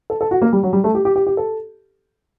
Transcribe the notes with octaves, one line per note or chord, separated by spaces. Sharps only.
A4
A4
F#4
A#3
G3
F#3
G3
A3
G4
G4
G4
G4
A4